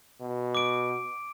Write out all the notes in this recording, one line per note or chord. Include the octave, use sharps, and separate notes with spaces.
B2
D6 D7